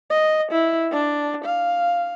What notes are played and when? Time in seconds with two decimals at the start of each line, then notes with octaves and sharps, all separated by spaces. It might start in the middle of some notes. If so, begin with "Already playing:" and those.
0.10 D#5
0.52 E4
0.91 D4
1.45 F5